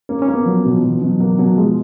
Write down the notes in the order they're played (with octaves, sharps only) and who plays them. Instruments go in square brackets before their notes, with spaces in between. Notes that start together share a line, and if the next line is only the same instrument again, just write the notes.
[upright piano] A#3 [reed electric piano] C#4
[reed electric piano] C#4
[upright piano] A#3
[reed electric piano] B3
[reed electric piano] F3 [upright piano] F#3
[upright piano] B2
[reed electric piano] F3
[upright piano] B2 [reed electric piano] E3
[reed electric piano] F3
[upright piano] B2 [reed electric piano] F#3
[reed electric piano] F#3 [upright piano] A#3
[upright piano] B2 [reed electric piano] F#3
[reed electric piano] F3 [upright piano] G#3